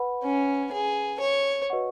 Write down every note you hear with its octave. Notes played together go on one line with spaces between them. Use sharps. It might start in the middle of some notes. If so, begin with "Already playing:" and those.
Already playing: B4 F#5 B5
C#4
G#4
C#5
F#4 B4 D#5 F#5 C#6